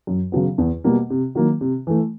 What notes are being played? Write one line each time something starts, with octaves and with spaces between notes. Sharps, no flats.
F#2
C#3 F#3 B3
E2
B2 G3 A#3
C3
D#3 F#3 A#3
C3
E3 A3